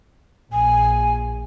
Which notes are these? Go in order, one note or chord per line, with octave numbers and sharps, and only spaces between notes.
A#1 G#5